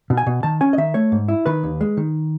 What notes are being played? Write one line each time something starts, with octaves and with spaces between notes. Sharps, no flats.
B2
G#5
B2
D#3 A5
C#4 G#5
D#5
D#3 E5
A3 C#5
G#2
E4
D#3 B4
D#2
G#3
D#3